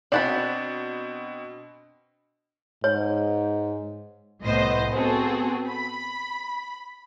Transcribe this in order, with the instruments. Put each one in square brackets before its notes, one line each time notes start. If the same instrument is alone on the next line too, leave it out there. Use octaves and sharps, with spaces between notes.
[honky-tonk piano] B2 C4 [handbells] D4 D#5 A6 [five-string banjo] D5 F#5 B5
[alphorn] G#2 [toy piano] C#5
[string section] C2 A2 B3 C5 D#5
B3 C4 F#4 G#4 A4
B5